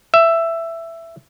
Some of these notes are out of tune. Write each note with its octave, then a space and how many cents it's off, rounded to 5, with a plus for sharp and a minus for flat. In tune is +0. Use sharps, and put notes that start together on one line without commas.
E5 +10